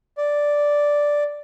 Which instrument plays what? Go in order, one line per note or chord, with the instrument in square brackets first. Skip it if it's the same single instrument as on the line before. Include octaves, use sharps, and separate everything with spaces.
[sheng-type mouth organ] D5